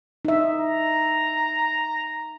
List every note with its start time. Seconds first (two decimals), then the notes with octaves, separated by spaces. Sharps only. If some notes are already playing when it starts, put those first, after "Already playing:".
0.25 D#4 E5
0.60 A#5